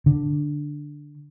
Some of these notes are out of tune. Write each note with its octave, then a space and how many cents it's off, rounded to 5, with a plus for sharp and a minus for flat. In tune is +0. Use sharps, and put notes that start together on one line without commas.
D3 +0